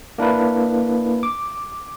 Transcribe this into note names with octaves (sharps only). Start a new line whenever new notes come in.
A#3 D4 E4 A#4 B4
D6